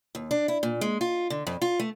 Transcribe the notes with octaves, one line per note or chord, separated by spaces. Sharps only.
D#2
D4
E4
A#2
G#3
F4
D3
F2
F4
A3